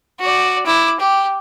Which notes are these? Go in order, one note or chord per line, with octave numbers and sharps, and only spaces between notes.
F#4 D5
E4 D6
G4